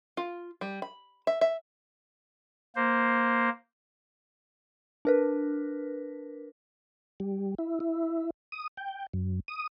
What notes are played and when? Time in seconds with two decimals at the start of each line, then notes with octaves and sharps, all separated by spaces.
0.17 F4
0.61 G3
0.82 B5
1.27 E5
1.41 E5
2.76 A#3 C5
5.05 D4 A#4 B4
7.20 G3
7.58 E4
7.80 E4
8.52 D#6
8.77 G5
9.13 F#2
9.48 D#6